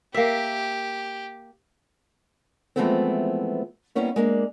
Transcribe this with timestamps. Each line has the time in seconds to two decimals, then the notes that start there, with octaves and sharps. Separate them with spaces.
0.14 A#3 G4 E5
2.76 E3 F3 G#3 A3 B3 C4
3.95 G3 A#3 B3 C#4 E4
4.16 G#3 A#3 D4